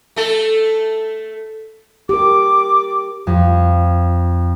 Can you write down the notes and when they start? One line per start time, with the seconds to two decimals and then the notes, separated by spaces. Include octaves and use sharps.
0.16 A3 A4
2.09 G4 A#4 D6
3.27 F2